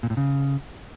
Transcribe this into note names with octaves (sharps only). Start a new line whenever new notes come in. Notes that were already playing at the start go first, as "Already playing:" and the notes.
A#2
A2
C#3